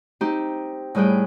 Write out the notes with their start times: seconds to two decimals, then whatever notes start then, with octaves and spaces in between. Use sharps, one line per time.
0.21 C4 D#4 G4
0.95 A2 G3 G#4 B4 G5